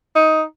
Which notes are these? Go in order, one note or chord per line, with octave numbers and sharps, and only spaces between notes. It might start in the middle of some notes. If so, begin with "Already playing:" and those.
D#4